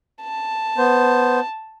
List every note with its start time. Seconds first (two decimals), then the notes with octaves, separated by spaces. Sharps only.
0.23 A5
0.78 B3 C5